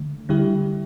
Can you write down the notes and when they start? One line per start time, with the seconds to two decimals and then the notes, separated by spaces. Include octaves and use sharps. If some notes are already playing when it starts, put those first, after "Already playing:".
Already playing: D3 A3
0.29 D3 G3 E4 G4